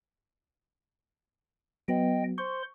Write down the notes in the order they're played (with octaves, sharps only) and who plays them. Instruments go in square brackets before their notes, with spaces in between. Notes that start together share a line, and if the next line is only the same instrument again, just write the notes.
[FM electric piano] F#3 B3 [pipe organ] D#5 G5
[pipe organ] C5 C6 [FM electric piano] C#6